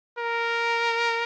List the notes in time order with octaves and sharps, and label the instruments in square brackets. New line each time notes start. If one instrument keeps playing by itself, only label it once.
[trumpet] A#4